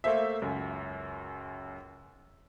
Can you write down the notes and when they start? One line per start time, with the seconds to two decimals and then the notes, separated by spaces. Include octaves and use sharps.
0.04 A3 A#3 C5 E5
0.42 C#2 F#2